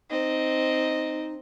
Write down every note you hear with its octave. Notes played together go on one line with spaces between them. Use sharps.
C4 D#4 D#5